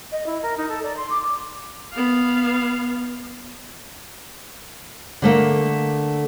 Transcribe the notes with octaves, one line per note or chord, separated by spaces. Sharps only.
D#5
E4
A#4
D#4
A4
D5
C6
D6
B3 F5
D3 A3 A#3